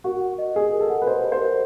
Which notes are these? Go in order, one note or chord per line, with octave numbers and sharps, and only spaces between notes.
F#4 A#4
F#5
D#5
G4 G#4
A#4
A4
F#5
B4
C5 D#5
G4
C5
A#4